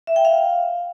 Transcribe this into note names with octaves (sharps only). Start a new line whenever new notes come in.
E5
G5
F5